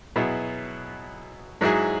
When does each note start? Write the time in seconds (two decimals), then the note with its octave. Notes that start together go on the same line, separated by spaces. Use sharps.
0.16 B2 F#3 B3 E4 G#4
1.61 G#2 F#3 E4 G#4